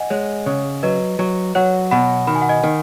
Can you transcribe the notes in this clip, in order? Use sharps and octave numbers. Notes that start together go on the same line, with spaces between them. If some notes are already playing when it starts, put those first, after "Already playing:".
Already playing: D#5 F#5 G#5
G#3 C#5
C#3 C#5
F#3 B4 D#5
F#3
F#3 C#5 F#5
B2 F#5 B5
D#3 B5
G#5
F#5
D#5 G#5
D#3